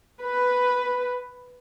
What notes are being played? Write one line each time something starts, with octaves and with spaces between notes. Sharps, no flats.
B4